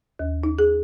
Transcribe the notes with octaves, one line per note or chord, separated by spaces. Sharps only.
D#2
D#4
G#4